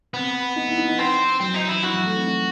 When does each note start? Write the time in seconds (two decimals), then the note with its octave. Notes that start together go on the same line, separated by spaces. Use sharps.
0.14 B3 C4
0.56 D#4
0.67 E4
0.77 D#4
0.88 D#4
0.99 C4
1.41 F#3 C4
1.55 D#4
1.69 E3 E4
1.83 E3 F#4
1.93 F#3
2.04 A3
2.15 C4
2.26 D#4